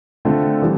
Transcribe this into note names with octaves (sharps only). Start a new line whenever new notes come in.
D3 A3 C4 F4
E3 G3